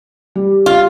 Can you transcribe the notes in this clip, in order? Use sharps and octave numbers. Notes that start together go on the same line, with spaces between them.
G3
F4